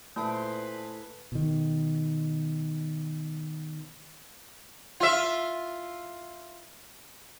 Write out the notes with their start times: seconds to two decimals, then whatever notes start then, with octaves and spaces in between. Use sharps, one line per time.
0.16 A#2 A3 E4 G#4 A4 B4 C5 A5
1.32 B2 D#3
5.00 F4 E5